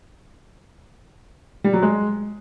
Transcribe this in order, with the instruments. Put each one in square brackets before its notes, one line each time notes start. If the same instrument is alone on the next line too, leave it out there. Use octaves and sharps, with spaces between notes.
[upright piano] G3
F#3
G#3